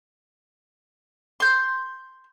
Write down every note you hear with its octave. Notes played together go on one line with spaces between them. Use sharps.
C6 G6